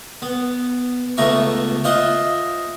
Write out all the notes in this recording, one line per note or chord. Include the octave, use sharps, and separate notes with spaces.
B3
C#2 A3 B3 E5 A#5 C#6
F4 C5 D#5 E5 F#5